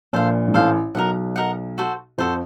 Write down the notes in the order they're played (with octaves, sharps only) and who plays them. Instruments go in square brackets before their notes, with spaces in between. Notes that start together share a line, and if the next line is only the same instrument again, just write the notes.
[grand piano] A#1 A#2 [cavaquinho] A4 C5 F5
[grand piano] G#2
[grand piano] A1 A2 [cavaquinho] A4 C5 F5
[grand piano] B1 B2 [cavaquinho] A#4 D#5 F#5
[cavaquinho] A#4 D#5 F#5
F#4 A4 C5
[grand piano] F2 F3 [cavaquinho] F#4 A4 C5